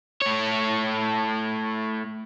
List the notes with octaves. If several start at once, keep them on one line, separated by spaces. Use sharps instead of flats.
A2 C#5